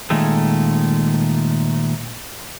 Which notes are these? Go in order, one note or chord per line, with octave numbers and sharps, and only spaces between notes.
A#2 D#3 G#3 A3